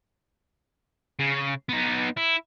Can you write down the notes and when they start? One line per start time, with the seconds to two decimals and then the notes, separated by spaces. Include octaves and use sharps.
1.19 C#3
1.69 B3 D#4
2.17 E4